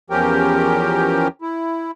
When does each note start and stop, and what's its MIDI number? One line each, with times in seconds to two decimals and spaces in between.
0.10 1.28 40
0.10 1.28 53
0.10 1.28 61
0.10 1.28 67
0.10 1.28 70
0.10 1.28 79
1.42 1.91 64